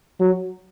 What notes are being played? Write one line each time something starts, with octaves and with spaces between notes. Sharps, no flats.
F#3